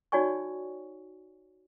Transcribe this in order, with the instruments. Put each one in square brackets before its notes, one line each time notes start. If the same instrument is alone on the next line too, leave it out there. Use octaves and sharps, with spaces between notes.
[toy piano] D#4 F#4 C#5 D5 G#5 C#6